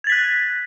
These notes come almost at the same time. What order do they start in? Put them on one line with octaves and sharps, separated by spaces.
G#6 A6 B6 F#6